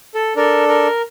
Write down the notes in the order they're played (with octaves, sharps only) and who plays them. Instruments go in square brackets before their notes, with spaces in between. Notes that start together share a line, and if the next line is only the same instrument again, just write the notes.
[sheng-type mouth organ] A4
D4 A4 A#4
A#4